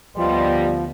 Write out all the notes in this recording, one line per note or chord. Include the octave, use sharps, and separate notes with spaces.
D2 F3 G3 B3 D#5 C6